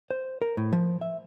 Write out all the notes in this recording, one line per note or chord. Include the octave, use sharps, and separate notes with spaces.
C5
A#4
A2
F3
E5